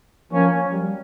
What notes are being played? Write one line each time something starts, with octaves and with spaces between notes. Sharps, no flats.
F3 A#3 C#4
G3